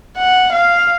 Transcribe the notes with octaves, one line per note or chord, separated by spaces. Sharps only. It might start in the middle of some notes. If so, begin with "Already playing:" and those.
F#5
F5